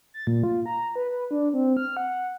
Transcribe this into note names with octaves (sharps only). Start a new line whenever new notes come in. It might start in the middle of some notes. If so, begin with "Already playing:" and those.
A6
A#2
F4
A#5
B4
B4
D4
C4
F6
F#5